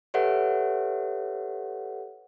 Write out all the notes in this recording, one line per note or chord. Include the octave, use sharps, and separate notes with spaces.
G4 A4 B4 C#5 E5 F#5